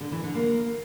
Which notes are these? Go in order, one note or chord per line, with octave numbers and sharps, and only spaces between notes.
D3
E3
D3
A#3